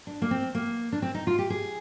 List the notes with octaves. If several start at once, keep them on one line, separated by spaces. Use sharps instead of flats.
D4
A#3
C4
A#3
D4
C4
D#4
F4
G4
G#4